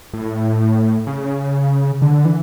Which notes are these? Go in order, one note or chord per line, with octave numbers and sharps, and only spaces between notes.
A2
C#3
D3
E3